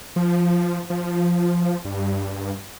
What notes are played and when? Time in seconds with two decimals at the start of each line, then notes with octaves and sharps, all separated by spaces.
0.16 F3
0.90 F3
1.85 G2